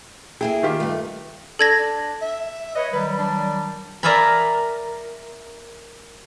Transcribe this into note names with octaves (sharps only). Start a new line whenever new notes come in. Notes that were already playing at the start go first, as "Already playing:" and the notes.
A#3 E4 G#4 G5
D#3 F4 G4
G2 A3
D4 A4 G#6 A#6
D4
E5
B4 C#5 D#5
D#3 F#3 G3 B4
D4
A#4 D5 E5 F5 G#5 B5